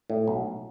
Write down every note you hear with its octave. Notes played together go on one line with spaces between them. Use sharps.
A2
B1